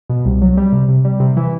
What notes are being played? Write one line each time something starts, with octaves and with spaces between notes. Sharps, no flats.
B2
C2
F#3
G3
C3
C3
G3
C3
E3